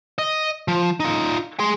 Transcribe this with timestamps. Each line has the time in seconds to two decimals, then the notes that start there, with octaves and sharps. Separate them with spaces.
0.18 D#5
0.68 F3
1.00 D#4 F4
1.59 G#4 C6